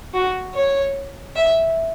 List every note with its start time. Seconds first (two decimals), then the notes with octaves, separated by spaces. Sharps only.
0.14 F#4
0.54 C#5
1.36 E5